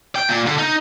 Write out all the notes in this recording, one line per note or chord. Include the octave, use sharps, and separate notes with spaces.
G5
A#2
D3
D#4